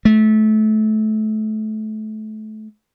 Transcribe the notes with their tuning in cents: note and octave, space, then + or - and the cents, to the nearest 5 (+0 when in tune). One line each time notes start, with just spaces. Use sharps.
A3 -25